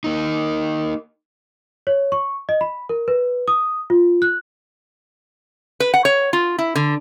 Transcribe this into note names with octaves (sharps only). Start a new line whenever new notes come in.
A#3 D#4
C#5
C#6
D#5
B5
A#4
B4
D#6
F4
F#6
B4
F#5
C#5
F4
E4
D3